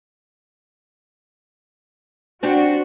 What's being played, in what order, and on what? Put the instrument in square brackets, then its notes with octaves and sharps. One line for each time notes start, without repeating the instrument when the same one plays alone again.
[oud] C4 D4 G4 [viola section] F#4